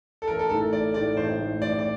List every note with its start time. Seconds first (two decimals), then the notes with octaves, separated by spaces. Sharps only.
0.22 A4
0.28 A1 A#4
0.39 A4
0.50 A2 A3 D#4 A4
0.61 A4
0.72 A1 D5
0.94 A2 A3 D#4 D5
1.17 A1 C5
1.39 A2 A3 D#4
1.62 A1 D5
1.79 D5